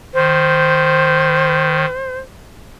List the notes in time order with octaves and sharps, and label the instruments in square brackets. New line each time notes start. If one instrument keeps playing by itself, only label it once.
[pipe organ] D#3 [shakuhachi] C5